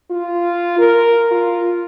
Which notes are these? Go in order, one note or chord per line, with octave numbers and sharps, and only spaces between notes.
F4
A#4
F4